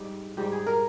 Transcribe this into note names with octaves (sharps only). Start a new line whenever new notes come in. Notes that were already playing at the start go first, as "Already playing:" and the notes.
Already playing: G#2 G3 G4
G#2 G3 G4
G#4
A#4